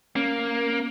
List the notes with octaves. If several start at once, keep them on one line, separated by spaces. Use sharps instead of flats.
A#3 C#4